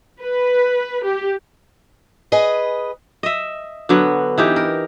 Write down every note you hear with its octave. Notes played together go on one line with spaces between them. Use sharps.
B4
G4
G#4 B4 D#5
D#5 E5
D3 F#3 B3
E3 D#4 G4
A#4